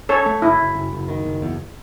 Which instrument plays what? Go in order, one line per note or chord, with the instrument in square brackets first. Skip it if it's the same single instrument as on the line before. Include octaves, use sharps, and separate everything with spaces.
[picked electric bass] C#4 [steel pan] A4 C#5
[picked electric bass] A3
[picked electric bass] F#1 [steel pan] E4
[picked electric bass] F#1
F#1
F#1
D#3
F#1
E2